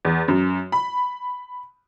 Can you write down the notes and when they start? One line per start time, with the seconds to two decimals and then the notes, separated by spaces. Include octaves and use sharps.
0.05 E2
0.28 F#2
0.72 B5